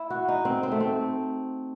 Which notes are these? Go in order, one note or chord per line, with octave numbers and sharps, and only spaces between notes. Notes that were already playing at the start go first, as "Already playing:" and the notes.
Already playing: E4
F#4
D#4
C4
C4
A3
C4